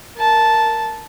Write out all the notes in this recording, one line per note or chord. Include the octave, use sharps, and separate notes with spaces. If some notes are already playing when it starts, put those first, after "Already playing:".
A#4 A5